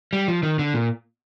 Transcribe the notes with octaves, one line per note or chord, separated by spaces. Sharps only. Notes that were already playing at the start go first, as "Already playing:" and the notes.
G3
F3
D#3
D3
A#2